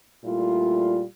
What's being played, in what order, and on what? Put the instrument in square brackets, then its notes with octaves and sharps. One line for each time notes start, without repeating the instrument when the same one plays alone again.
[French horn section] A#2 G3 A3 E4 F4